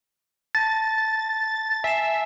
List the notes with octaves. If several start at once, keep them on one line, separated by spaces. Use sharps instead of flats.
A5 A6 A#6
E5 G#5 C7 E7